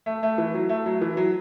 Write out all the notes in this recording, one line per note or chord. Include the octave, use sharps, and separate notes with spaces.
A3
A3
E3
F#3
A3
F#3
E3
F#3